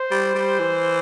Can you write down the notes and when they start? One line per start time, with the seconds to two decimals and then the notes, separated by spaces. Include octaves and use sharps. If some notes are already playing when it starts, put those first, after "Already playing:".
Already playing: C5
0.11 G3
0.35 G3
0.59 E3